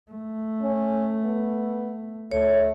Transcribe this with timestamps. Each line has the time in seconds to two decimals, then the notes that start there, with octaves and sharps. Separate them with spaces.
0.11 A3
0.62 C#4
1.25 B3
2.31 D2 A3 C#5